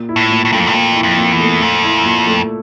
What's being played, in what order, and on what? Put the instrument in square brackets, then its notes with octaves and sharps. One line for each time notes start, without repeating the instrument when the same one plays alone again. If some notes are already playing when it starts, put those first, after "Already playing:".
Already playing: [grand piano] A#2
E4
[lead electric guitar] A2
[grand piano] A#2
[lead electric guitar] A2
[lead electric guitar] G2 [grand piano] A3
[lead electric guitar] F2
G2
[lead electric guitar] F2 [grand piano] A#2
[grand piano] E4
[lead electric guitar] F2
[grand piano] A#2
[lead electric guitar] E2
[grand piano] A3
[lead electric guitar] F2 [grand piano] A#2
[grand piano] E4
A#2
A3